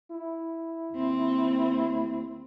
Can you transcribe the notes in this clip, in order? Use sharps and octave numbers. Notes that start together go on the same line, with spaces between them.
E4
D#2 C4